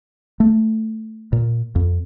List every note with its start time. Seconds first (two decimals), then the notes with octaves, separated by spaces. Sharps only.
0.40 A3
1.33 A#2
1.76 F2